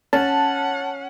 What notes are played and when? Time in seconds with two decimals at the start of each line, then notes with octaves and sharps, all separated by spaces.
0.13 C#4 F#5 A5